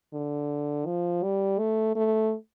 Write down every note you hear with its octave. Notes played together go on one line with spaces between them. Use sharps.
D3
F3
G3
A3
A3